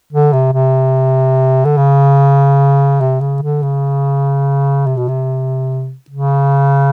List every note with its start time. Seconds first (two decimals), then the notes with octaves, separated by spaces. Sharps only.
0.13 D3
0.33 C3
0.53 C3
1.65 D3
1.77 C#3
3.00 C3
3.21 C#3
3.42 D3
3.62 C#3
4.87 C3
4.97 B2
5.08 C3
6.10 C#3